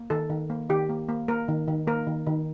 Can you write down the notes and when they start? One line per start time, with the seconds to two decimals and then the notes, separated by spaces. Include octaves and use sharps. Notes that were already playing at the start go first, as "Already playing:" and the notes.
Already playing: A#3
0.10 D#3 A4
0.30 D#3
0.50 A#3
0.69 D#3 G4
0.89 A#3
1.09 A#3
1.28 A#3 A#4
1.48 D#3
1.68 D#3
1.87 A#3 A#4
2.07 D#3
2.26 D#3